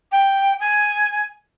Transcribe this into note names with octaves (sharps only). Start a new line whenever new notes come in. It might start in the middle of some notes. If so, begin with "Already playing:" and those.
G5
G#5